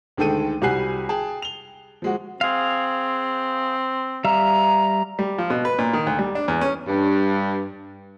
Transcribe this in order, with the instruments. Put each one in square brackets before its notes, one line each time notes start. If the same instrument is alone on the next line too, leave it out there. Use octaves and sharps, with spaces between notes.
[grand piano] D2 D#3 G#3 A4 G5 D#7
C2 G3 F#4 G#5 F#6 C7
G#4 G5 A5
F7 G7
F3 G#3 F#4
[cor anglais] C4 [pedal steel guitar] G#4 F5
[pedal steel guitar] G3 E5 F5 [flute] A#5
[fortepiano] G3
F3
B2
B4
A#2
D#3
D2
G3
D4
E2
C#4
[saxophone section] G2